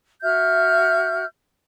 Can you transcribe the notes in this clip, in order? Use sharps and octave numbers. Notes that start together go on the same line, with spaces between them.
F#4 E5 F6 G6